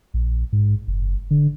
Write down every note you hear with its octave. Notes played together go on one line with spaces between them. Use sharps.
A#1
G#2
F#1
D3